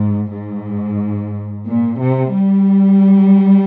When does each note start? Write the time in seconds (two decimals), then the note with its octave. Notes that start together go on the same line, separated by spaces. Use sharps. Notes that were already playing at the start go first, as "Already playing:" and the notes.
Already playing: G#2
0.32 G#2
1.67 A#2
2.01 C3
2.35 G3